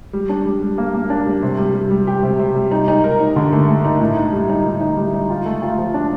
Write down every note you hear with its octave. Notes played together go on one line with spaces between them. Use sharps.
G3
D4
G3
G3
A#3
A#3
D4
G3
C3
G3
G3
G3
G4
C3
C3
G3
D#4
D#4
A#4
D#4
D3
A3
A3
D#4
A2
D#4
G3
D#4
A2
D#4
G3
D#4
F4
A3
F4
F3
D4